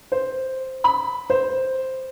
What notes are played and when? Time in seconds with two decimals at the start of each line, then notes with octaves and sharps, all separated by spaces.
0.12 C5
0.84 B5
1.30 C5